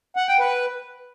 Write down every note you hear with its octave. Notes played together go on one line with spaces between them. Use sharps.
F#5
G5
B4